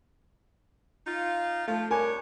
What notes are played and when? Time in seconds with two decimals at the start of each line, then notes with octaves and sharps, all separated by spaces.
1.06 D#4 F4
1.68 F3 A3 F4 A4
1.90 G3 D4 A#4 C#5 G#5